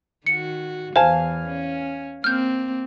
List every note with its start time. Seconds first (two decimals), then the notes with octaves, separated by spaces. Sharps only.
0.26 D#3 F#4 C#7
0.96 E2 E3 C5 F5 G#5 A5
1.47 C#4
2.24 A#3 C4 F6 G6